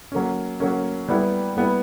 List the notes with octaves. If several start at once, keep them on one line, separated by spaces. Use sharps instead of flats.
F#3 A#3 C#4
F#3 A#3 C#4
G3 B3 E4
G3 B3 E4